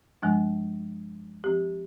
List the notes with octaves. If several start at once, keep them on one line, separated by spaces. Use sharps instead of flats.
G2 F3 G#3 D4
F3 C4 G4